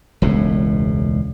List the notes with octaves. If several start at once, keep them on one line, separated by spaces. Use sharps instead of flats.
E1 C#2 A2